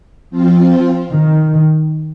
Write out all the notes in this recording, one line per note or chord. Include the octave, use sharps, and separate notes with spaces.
F3 C4 F4
D#3